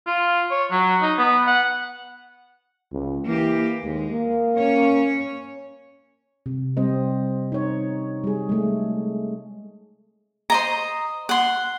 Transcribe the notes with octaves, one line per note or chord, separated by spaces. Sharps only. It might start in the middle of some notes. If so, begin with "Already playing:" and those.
F4
C#5
F#3
D#4
B3
F#5
C#2
E3 A#3 G4
D#2 G#3
A#3
C#4 C#5
C3
G3 C4 C5 D#5
D#4 C#5
G3 G#4
G#3 A3
C5 D#5 A#5
F#5 C6